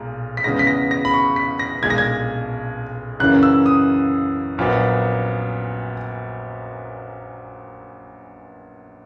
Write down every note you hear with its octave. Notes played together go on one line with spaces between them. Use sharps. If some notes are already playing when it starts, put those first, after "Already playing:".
Already playing: B1 A#2 G#3
B6
E2 C#3 G#3 B3 A#6
B6
A#6
A#6
B5
C#6
B6
A#6
B1 A#2 G#3 G#6
A#6
G#6
F#2 C#3 E3 A#3 C#4 F#6
E6
D#6
A#1 A#2 F#3 B3